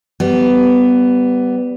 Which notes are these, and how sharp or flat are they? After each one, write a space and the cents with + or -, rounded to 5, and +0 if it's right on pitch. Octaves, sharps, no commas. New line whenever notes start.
G3 -10 B3 +10